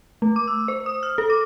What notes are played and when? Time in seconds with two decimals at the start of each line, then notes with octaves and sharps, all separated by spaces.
0.22 A3
0.36 D6
0.48 E6
0.68 C5
0.86 D#6
1.03 F6
1.18 A4
1.30 D6